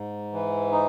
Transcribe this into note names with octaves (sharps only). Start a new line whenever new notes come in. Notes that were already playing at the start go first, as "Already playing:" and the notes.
Already playing: G#2
E3
D#4